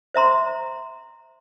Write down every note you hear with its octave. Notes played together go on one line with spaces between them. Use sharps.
C5 E5 A#5 C6